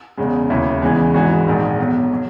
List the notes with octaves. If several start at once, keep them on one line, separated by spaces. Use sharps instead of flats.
E1 E2 C#3 G#3
D#2 C#3 F#3 E4
E2 C#3 E3 G#3
G#1 G#2 E3 G#3 F#4
A#1 G#2 D#3 G#3
B1 B2 F#3
F#3